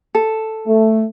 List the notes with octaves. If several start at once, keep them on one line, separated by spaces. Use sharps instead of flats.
A4
A3